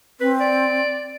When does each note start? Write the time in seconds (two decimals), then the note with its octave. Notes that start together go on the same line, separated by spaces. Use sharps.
0.20 C4 B4
0.40 D5